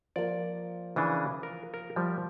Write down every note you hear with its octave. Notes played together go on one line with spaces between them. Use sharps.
F3 A#3 D5
C#3 E3 D4 D#6
A#4
A#4
F3 G3